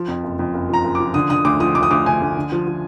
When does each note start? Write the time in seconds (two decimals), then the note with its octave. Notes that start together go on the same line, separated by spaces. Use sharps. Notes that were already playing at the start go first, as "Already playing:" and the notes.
Already playing: F3
0.08 F2
0.23 F#1
0.39 F2
0.54 F#1
0.69 F3 A#5
0.84 F#1
0.95 D6
1.00 F3
1.14 D3 D#6
1.30 D3 D#6
1.44 D2 D6
1.60 F3 D#6
1.75 D2 D6
1.83 D#6
1.90 D2 D6
2.06 D2 G#5
2.21 D2
2.37 D3
2.52 F3
2.67 F3